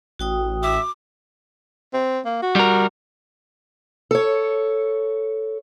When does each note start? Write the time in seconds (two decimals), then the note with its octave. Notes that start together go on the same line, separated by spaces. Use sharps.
0.19 A1 F#4 G5 D#6
0.63 E5 D6
1.93 C4
2.25 A#3
2.42 F#4
2.56 G3 A#4
4.11 A4 C#5